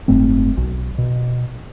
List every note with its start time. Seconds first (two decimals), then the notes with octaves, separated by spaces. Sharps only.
0.08 F#1 G#2 A3 C4
0.57 B1
0.98 B2